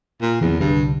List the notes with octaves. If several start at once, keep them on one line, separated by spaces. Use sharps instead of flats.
A#2
E2 D#3 F3 C4
C2 G2 D3